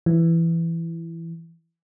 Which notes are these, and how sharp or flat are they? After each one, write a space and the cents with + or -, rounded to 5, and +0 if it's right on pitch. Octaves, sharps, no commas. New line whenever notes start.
E3 +10